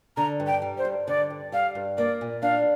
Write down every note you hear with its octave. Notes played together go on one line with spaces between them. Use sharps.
D3 A#5
G2
G5
G3
C5
G2
D3 D5
G2
G3 F5
G2
A#3 D5
A#2
D4 F5